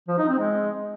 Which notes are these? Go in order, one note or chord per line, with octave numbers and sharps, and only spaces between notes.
F3
D#4
C4
G#3